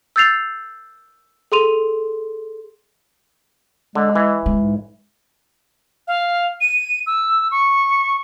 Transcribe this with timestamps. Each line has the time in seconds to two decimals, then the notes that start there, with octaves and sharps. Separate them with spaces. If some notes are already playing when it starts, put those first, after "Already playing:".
0.16 E6 G6 A6 C7 F7
1.52 G#4 A4 C6 D#7 F7
3.95 D3 G#3
4.16 E3
4.46 G#3
4.61 G#2
6.07 F5
6.61 D#7
7.06 E6
7.51 C#6